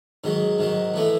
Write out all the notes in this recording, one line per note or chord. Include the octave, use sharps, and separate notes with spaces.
G#2 D#3 F#3
G#2 D#3 F#3
A2 E3 A3